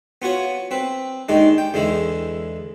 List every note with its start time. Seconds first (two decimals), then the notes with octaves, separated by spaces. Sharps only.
0.22 B3 F4 F#4 C#5
0.71 C4 B4
1.29 D#2 D#3 G#3 D4
1.58 G5
1.74 E2 D3 G#3 E4